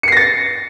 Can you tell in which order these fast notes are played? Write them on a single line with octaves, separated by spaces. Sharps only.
C#7 C7 A#6 A6